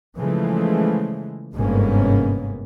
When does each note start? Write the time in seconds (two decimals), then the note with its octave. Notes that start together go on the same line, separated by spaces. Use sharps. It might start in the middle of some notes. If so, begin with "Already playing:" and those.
0.17 C#3 E3 F3 G#3 A3
1.54 G1 G#2 C3 A#3 B3 C#4